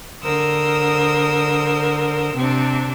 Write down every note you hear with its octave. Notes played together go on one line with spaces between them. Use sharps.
D3 A#4 C5 D#6 E6
C3 C4 D4